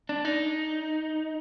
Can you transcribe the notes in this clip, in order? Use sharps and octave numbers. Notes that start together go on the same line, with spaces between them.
D4
D#4